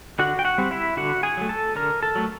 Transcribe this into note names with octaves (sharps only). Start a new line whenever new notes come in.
D3 F#4 F#5
G5
F#4 F#5
G3 C4
E4 E5
D3 F#4 F#5
G#4 G#5
F#3 A3
A4 A5
D3 A#4 A#5
A4 A5
F#3 A3